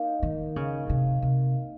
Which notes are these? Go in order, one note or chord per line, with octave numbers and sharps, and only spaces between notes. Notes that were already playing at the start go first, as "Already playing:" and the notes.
Already playing: A#3 D#4
D#3
C#3
C3
C3